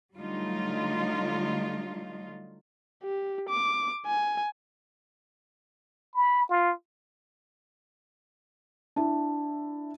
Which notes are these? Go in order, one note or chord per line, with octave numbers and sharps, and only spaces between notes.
D3 F#3 G3 A3 D#4 F4
G4
D6
G#5
B5
F4
D4 E4